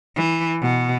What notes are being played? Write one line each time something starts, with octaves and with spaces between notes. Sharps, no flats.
E3
B2